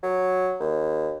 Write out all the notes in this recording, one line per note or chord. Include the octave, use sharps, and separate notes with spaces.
F#3
D#2